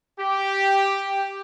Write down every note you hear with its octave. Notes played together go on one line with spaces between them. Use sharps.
G4